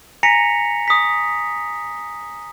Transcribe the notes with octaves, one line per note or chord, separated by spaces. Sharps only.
G#5 A#5 A#6 B6 C#7 F7
D#6 B6